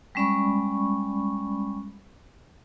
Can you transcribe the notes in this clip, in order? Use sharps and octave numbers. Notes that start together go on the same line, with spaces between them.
G3 G#3 C#4 D5 B5 C#6